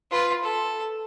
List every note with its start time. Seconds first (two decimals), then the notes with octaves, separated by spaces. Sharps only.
0.11 F4 B4
0.43 A4